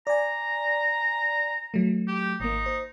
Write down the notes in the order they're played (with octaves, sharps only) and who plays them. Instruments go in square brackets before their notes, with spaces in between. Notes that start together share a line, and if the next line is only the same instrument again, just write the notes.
[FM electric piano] D5 G#5 [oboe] A#5
[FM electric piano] F#3 A3
[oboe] G4
[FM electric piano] G#1 A#3 [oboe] D#4
[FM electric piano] C5